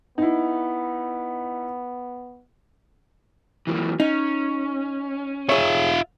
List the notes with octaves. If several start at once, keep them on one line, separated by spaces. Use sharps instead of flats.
B3 D#4 E4
E3 F#3 A#3
C#4 D#4
F4 G#4 C#5 E5